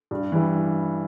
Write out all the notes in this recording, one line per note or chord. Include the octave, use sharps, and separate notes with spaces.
G2
E3 G3